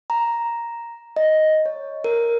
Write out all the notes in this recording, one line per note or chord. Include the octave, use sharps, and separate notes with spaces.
A#5
D#5
C#5
A#4